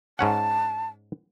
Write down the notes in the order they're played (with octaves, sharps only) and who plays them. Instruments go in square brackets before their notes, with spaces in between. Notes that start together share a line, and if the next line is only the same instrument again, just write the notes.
[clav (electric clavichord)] G#2 C#4 F#5 [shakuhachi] A5